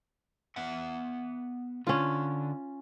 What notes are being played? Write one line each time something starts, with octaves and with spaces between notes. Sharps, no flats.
B3 E5 F#5
D3 C#4 F4